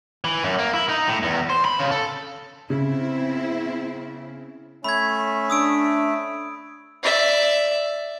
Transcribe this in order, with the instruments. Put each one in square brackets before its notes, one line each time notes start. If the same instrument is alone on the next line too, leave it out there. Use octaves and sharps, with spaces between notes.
[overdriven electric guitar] E3
F#2
A#3
E4
D#4
A2
E2
C5
B5
C#3
A4
[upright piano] C#3 [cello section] B3 C4 E4
[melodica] A3 E5 [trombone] C#4 [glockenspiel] B5 G#6
[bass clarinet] D4 [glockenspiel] D#6 E6 D7
[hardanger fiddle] D5 E5